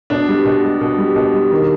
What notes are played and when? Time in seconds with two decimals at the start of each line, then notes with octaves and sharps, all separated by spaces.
0.10 B2 D4
0.28 G3
0.45 B2
0.64 G3
0.81 B2
0.98 G3
1.16 B2
1.34 G3
1.51 D#3